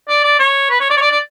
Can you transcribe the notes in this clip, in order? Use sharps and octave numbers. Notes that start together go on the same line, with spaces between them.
D5
D5
C#5
B4
C#5
D5
C#5
D5
D5